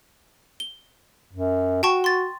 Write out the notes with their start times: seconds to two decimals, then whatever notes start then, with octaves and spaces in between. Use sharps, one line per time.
0.60 G7
1.33 F#2
1.83 F#4 G5 A5 C#6
2.04 C6 A6